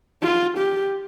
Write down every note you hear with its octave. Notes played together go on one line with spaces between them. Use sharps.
F4
G4